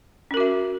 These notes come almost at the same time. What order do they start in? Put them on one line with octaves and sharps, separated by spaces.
C#4 A#4 F#4 E5